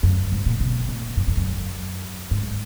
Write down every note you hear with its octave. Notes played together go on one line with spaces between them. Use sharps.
F#2
G#2
A#2
B2
A#2
F#2
F2
F#2
G#2